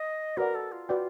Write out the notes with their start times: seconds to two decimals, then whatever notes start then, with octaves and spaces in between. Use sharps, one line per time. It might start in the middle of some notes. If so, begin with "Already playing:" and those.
Already playing: D#5
0.37 F#4 A#4 B4 D5 F#5
0.55 A4
0.72 F4
0.89 F#4 B4 D5 G5